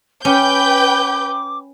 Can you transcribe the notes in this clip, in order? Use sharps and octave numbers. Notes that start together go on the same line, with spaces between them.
C#4 B4 G5 D6 G6